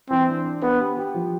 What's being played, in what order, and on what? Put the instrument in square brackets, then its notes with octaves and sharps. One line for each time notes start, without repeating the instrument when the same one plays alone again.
[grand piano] E3 [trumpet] C4
[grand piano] D4
D4
[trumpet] B3 [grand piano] B4
[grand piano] G4
G4
F3